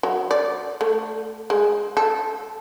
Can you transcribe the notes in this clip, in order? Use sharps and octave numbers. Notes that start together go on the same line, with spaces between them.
F#3
D5
A3
G#3
A4